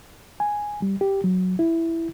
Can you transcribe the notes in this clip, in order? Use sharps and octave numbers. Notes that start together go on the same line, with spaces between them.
G#5
G3
G4
F#3
E4